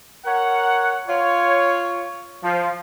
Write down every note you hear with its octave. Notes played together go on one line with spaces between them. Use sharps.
A#4 C#5 F#5
F4 C#5
F3